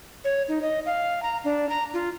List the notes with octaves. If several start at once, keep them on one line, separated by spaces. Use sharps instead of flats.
C#5
D#4
D#5
F5
A#5
D4
A#5
F4